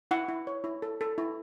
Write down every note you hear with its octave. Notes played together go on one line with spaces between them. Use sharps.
E4 F#5
E4
C#5
E4
A4
A4
E4